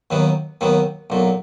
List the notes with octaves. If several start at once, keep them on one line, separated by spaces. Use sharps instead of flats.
D#2 D#3 F#3 B3
D#2 D#3 F#3 B3
B1 A#2 F#3